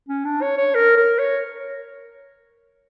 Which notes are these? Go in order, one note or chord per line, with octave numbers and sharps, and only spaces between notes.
C#4
D4
C#5
C#5
A#4
A#4
C#5